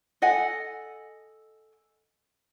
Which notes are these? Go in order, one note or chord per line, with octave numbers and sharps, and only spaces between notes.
A4 D#5 F#5 G#5